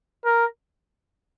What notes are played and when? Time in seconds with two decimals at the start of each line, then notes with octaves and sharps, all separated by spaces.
0.25 A#4